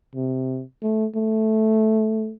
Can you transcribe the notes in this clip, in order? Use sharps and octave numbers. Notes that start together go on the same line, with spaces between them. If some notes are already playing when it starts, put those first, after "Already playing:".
C3
A3
A3